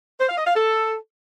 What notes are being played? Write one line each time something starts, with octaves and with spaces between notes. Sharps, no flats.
C5
F5
D#5
F5
A4